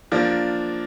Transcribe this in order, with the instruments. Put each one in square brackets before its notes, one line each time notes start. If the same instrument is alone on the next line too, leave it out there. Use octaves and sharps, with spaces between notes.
[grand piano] F3 A#3 D4